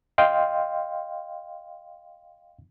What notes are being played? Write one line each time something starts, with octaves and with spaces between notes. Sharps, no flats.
D#5 F5 G5 C6